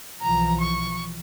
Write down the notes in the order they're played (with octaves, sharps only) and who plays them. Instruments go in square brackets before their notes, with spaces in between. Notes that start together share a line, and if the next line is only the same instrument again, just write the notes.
[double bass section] B1 E3 F3 [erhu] A#5
[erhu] C#6